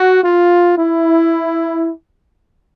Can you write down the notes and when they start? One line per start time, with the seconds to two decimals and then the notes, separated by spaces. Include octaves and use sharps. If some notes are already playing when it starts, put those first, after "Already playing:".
Already playing: F#4
0.23 F4
0.77 E4